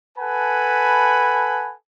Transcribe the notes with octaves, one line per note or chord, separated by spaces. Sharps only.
A4 B4 F#5 G#5 A5 B5